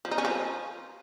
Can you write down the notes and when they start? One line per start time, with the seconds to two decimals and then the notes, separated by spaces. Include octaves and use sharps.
0.05 F3
0.11 D#4
0.18 C#4
0.25 F3